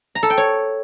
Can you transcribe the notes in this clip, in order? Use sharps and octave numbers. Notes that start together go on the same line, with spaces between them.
A#5
A4
G5
C#5